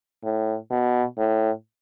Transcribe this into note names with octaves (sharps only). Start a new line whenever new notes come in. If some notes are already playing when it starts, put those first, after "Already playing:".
A2
B2
A2